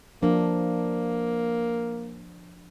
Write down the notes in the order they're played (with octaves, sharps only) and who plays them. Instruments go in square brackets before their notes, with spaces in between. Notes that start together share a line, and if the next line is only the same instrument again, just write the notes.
[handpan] F3 D4 [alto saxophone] A#3